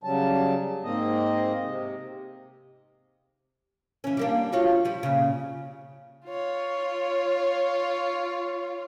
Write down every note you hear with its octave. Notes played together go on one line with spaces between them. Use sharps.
C#3 F#3 G3 A5
G#2 A#3 C4 D#5
C3
E3 C#4
G3 A#3 D4
F4 F#4 C#5
F3 G3
A#2 C#3
F4 C#5